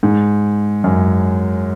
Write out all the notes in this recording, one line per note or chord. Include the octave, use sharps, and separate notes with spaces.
G#2
F#2